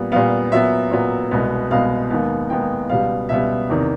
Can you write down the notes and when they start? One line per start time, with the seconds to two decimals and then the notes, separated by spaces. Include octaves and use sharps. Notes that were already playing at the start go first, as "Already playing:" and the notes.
Already playing: A#2 G3 B3
0.12 A#2 G3 B3 F5
0.52 A#2 F#3 B3 E5
0.91 A#2 F#3 B3
1.31 C2 B2 G#3 B3
1.71 C2 B2 G#3 B3 F5
2.10 D#2 D#3 G#3 B3
2.50 D#2 D#3 G#3 B3 G5
2.89 C#2 B2 G3 B3 F5
3.29 C#2 B2 G3 B3 E5
3.69 E2 C3 D#3